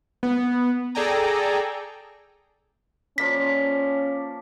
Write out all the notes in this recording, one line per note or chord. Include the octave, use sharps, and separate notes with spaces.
B3
G#4 A4 D5 G5 G#5 A#5
F3 A#3 C#4 D5 B6